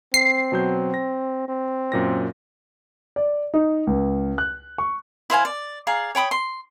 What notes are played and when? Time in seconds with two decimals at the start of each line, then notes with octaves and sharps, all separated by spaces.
0.14 C4 C7
0.52 B2 F#3 G6
0.94 A#6
1.48 C4
1.92 F#2 A#2 A#6
3.16 D5
3.54 D#4
3.87 C#2
4.38 F#6
4.78 C#6
5.30 E4 C5 F5 G#5
5.45 D5
5.87 G#4 D5 F5 A#5
6.15 C#5 G5 B5 D#6
6.31 C6